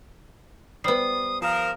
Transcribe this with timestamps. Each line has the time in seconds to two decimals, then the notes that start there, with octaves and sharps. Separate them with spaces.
0.84 G3 B3 C5 D#6 C7
1.42 F3 A#4 D#6 F6 E7